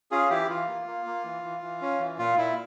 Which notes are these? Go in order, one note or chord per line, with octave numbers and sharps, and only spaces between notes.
C#4 F4 G#4
E3 E4 G4
E3 F4
A#3
A#3
A#3
E3
E3
E3
C#4
E3
A#2 F4
A#2 E4